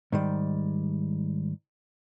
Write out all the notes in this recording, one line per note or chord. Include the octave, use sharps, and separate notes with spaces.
G#2 D#3 G3